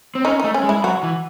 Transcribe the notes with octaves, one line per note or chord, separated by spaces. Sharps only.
C4
C#4 D#4
A3 D#4
C#4
G#3
E4
F#3 F#4
E3